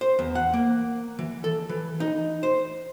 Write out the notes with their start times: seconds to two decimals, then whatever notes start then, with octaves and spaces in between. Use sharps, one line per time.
0.01 C5
0.19 E2
0.35 F#5
0.54 A#3
1.19 E3
1.44 A4
1.69 E3
2.00 D#4
2.43 C5